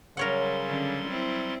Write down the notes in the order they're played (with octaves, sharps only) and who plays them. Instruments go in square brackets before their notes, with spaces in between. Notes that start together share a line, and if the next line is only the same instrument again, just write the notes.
[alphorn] C#3 [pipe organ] F#3 G3 C6 [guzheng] A#4 C#5 F#5
[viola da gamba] D3 C#4
C4 E4